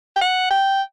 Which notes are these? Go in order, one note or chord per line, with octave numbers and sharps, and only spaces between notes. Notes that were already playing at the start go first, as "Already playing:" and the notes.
G5
F#5
G5